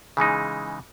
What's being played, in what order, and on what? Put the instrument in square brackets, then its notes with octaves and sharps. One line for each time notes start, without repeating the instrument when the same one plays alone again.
[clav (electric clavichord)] C#3 E3 G#3 D#4